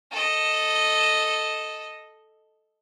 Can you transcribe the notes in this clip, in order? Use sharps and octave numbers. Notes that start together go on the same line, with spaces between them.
A4 D#5